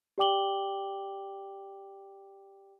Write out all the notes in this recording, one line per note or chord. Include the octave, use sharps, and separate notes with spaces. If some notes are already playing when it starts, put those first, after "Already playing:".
G4 D5 G5 D6 F#7 G7